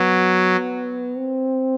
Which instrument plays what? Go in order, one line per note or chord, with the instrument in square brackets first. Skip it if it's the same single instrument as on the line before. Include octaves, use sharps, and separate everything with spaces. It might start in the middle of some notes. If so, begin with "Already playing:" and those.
Already playing: [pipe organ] F#3 [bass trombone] B3
[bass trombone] C4